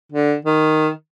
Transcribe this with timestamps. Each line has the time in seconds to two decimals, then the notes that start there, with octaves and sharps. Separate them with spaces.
0.12 D3
0.45 D#3